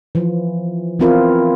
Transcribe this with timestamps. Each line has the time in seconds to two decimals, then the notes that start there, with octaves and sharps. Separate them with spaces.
0.15 E3 F3
1.00 E3 B3 C4 E4 F4 A#4